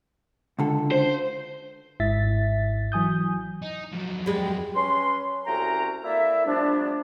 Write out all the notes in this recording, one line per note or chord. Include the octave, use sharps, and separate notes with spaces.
C#2 D3 A4
C5
G#1 G#2 E4 E5 A6 B6
E3 F#3 G#5 D#6 G6
D#4
F2 F#3
G3 G#3
C#4 B4 C6
C2 A3 C#4 F#4 G5 A#5
A#3 E4 A4 D5 E5
C3 F3 G3 A3 B3 D4